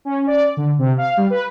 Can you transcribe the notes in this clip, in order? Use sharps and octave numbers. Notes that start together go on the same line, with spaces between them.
C#4
D5
D3
C3
F5
G3
B4